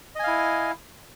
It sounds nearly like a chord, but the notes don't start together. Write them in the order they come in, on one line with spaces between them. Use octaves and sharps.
D#5 G#5 F5 E4